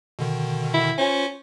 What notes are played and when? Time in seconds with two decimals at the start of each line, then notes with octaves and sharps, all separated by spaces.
0.19 B2 D3 D#3
0.74 E4
0.98 C#4 F4 C5 G#5